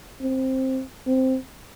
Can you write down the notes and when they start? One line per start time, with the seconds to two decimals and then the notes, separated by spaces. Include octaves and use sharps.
0.21 C4
1.07 C4